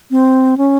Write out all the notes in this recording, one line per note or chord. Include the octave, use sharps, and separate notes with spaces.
C4
C#4